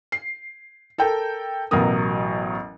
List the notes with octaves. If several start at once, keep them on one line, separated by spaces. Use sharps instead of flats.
C7
A4 A#4 G5
A1 B2 F#3 B3 A#4 D#6